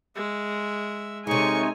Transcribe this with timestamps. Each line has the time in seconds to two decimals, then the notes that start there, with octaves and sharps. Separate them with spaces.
0.16 G#3 E5
1.27 C3 G#3 D#4 A4 C#5 G#5 C#6